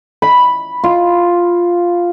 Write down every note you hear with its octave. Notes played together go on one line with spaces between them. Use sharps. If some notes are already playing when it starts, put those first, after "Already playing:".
B5
F4